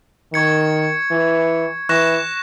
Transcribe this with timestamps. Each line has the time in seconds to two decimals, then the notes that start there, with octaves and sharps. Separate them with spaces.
0.33 D#3 C#6 G#6 C#7
1.11 E3
1.89 E3 C#6 F#6 A#6 E7